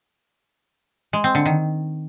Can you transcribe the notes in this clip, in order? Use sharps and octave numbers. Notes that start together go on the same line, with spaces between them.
G#3
C4
D3
D#3